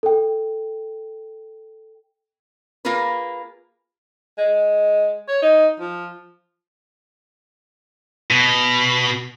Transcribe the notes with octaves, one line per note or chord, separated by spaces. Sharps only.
A4 G5
A#3 F4 G#4 A#4 B4
G#3
C#5
D#4
F3
B2